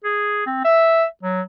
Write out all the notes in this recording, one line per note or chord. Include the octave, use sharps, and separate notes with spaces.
G#4
C4
E5
F#3